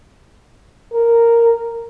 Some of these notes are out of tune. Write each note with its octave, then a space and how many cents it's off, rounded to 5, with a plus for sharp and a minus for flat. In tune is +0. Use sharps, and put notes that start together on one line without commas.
A#4 -5